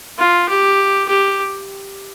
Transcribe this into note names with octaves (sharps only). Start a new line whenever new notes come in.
F4
G4
G4